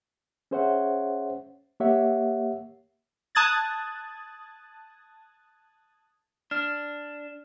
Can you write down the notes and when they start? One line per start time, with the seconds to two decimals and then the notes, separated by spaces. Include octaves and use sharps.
0.51 C#4 G#4 C5 C#5 E5 F#5
1.80 A#3 G4 C#5 E5 F#5
3.35 A5 D#6 F#6 G#6 A6
6.51 D4 F6